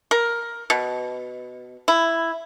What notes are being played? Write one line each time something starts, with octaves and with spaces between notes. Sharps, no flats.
A#4
B2
E4